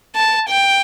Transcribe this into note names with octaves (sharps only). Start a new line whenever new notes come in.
A5
G5